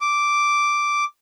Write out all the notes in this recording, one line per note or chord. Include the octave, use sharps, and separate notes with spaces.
D6